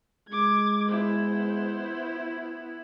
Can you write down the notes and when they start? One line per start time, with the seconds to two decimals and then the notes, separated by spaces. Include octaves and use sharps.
0.29 G#3 D6 G#6
0.89 B3 E4 C5